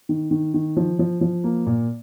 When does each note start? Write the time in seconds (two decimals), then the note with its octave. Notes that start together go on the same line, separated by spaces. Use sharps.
0.09 D#3
0.31 D#3
0.54 D#3
0.77 F3
0.99 F3
1.21 F3
1.44 A#3
1.66 A#2